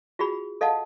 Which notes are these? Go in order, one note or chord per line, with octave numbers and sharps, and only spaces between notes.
F4 F#4 G#4 B5
A4 D#5 F5 F#5 A5